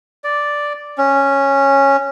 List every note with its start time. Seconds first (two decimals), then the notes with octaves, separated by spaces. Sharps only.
0.24 D5
0.98 C#4